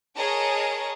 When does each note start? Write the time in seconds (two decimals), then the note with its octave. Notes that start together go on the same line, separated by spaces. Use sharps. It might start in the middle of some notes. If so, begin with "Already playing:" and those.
0.17 G#4 A#4 C#5 D#5 A5